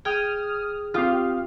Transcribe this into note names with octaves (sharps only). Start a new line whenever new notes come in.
G#4 G5 D#6 F6 G#6
C4 F4 G4 F5 D#6 F6